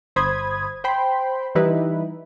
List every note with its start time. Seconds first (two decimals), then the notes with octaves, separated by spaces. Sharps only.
0.16 G1 C5 B5 D#6 G#6
0.84 C5 G5 B5 C6
1.55 E3 G3 D#4 E4 B4